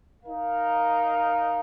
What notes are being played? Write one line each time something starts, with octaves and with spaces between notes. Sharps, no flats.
D#4 A#4 F5